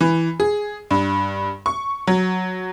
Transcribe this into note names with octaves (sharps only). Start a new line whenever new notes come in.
E3
G#4
G2
C#6
F#3